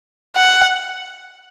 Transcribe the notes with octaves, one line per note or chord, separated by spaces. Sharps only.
F#5